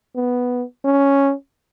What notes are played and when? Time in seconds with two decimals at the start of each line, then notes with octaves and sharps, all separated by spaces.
0.16 B3
0.85 C#4